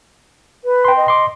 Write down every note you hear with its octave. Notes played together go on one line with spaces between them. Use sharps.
B4
G5 C6
D#5
C6 D6